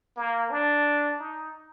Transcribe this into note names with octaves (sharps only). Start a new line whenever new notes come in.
A#3
D4
D#4